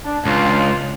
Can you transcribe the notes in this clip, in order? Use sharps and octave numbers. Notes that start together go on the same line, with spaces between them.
D4
C#2 D4 F4 F5